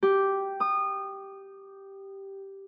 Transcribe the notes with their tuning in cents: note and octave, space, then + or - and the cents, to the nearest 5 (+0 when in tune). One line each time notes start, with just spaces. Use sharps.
G4 -5
D#6 -25